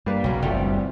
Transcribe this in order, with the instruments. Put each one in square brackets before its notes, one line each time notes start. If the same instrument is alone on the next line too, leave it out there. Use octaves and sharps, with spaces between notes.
[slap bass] G2 [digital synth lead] G3 [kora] A#3 B4
[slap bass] B1 [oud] C#3 A#3 [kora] F#3
[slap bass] F#1 D2 [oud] C3 [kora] E3 A3 F4